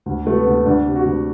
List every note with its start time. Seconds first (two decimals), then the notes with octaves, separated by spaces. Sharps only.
0.06 D2
0.25 C3 A3
0.35 B3
0.45 D2
0.65 D2 D4
0.85 C3
0.95 F#4
1.05 D2